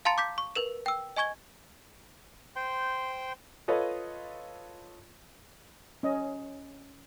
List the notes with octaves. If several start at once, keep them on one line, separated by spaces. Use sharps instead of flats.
F5 A5 A#5 C6 A6 C#7
D6 G6 B6
C#6
A#4 B4 E7
G5 E6
D#5 G#5 C#6 G#6 G7
C5 G5 C6
F4 A4 B4 C#5 D#5
C#4 D#5